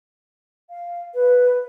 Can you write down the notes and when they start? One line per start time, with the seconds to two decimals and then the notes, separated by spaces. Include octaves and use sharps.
0.70 F5
1.15 B4